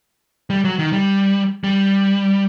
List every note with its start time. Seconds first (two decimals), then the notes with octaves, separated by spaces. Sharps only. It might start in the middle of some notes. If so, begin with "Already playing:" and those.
0.50 G3
0.65 F#3
0.79 D#3
0.93 G3
1.64 G3